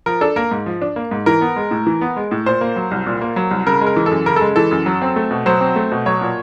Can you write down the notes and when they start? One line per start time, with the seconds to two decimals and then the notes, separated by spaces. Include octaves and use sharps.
0.06 F3 A#4
0.21 D4 A4
0.36 A#3 A#4
0.51 G#2
0.66 F3
0.82 D4
0.96 A#3
1.11 G#2
1.26 E3 A#4
1.41 B3
1.56 G#3
1.71 A2
1.87 E3
2.01 B3
2.16 G#3
2.31 A2
2.46 A#2 C5
2.61 A#3
2.76 F#3
2.91 C2
3.06 A#2
3.21 A#3
3.36 F#3
3.51 C2
3.67 C#3 A#4
3.81 G#3
3.87 A#4
3.96 E3
4.06 A4
4.11 F#2
4.26 C#3 A#4
4.36 A4
4.41 G#3
4.56 E3 A4
4.71 F#2
4.86 F#3
5.02 C4
5.16 A3
5.31 B2
5.46 F#3 C5
5.61 C4
5.76 A3
5.92 B2
6.06 F#3 C#5
6.21 A#2